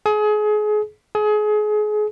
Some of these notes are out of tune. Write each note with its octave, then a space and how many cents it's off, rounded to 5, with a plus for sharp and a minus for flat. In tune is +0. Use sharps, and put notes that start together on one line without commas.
G#4 +30
G#4 +30